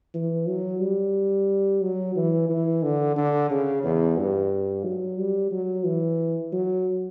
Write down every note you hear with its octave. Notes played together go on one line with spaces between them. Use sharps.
E3
F#3
G3
F#3
E3
E3
D3
D3
C#3
E2
G2
F#3
G3
F#3
E3
F#3